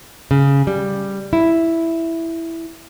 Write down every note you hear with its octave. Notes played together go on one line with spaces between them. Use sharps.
C#3
G3
E4